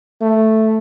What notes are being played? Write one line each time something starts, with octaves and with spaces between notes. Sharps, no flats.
A3